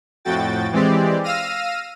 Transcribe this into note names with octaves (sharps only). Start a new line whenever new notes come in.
F2 A2 F#4 G5 A6
E3 G#3 C4 G4 D5
F5 E6 F6 A#6 D#7